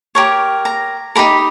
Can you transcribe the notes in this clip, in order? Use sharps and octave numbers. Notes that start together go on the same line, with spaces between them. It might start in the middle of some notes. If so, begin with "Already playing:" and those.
G4 A#4 C#5
A#5
D#4 G4 A#4 B5